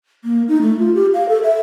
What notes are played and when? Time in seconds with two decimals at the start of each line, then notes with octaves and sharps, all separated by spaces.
0.24 A#3
0.48 D#4
0.62 A3
0.79 F4
0.95 G4
1.14 F5
1.29 A4
1.43 E5